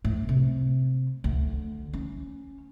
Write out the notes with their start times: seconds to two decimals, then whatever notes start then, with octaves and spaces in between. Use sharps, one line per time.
0.05 A2
0.29 C3
1.24 D2
1.93 C#4